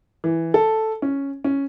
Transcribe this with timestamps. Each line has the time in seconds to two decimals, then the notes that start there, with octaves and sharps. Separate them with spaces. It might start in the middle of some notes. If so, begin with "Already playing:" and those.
0.24 E3
0.54 A4
1.02 C#4
1.44 C#4